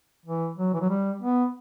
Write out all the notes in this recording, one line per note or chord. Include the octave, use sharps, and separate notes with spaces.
E3
F#3
E3
F#3
G3
B3